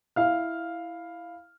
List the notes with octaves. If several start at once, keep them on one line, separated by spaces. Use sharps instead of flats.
E4 F5 F6